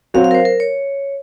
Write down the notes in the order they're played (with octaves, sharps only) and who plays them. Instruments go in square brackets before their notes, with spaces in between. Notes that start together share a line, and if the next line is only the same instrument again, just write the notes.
[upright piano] F#3 C4 F#4 [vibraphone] F5
[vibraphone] F5
A#4
C5
A#4
C#5